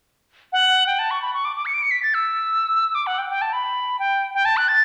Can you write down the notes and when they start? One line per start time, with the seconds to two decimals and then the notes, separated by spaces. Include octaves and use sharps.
0.53 F#5
0.87 G5
0.99 A5
1.11 C#6
1.22 B5
1.34 C#6
1.45 D6
1.57 D6
1.66 C#7
1.74 D7
1.82 C#7
1.91 B6
2.03 A6
2.14 E6
2.95 D6
3.07 F#5
3.18 G5
3.30 G5
3.41 A5
3.53 B5
3.99 G5
4.34 G5
4.45 A5
4.57 F#6
4.68 A6